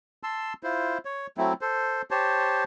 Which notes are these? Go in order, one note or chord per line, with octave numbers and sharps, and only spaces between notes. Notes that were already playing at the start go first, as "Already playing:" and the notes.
A5 C6 E6
E4 F4 C5
C#5
F#3 A3 C4 E4
A4 C5
G4 C5 C#5 A5